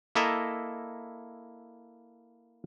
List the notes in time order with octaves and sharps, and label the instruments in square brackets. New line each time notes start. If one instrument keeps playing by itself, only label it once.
[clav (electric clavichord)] A#3 E4 A4 D#5 E5 A#5